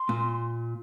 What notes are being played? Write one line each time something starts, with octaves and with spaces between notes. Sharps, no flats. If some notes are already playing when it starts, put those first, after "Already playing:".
Already playing: C6
A#2